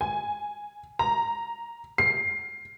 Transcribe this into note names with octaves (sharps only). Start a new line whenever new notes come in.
G#5
A#5
C7